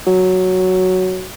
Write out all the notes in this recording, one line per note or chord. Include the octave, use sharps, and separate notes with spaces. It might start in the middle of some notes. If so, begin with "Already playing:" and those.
F#3